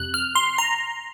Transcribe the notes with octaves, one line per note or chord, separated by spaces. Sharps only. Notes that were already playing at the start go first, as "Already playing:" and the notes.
Already playing: F2 C3 F#6
F6
C6
A#5